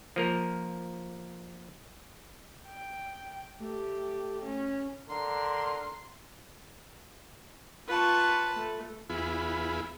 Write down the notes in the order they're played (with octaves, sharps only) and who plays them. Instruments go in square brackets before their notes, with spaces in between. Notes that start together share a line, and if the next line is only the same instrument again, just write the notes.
[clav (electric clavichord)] F3 A#3 A#4
[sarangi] G5
[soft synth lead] A3 [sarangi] G4
[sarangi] C#4
[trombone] D3 [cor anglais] A#4 [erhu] C6
[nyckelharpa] F4 C#6 [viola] B4 A5
[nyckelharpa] A3
[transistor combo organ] E2 B3 E4 F4 G#4 B5